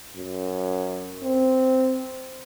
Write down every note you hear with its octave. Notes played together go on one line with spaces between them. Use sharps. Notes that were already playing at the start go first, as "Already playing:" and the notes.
F#2
C4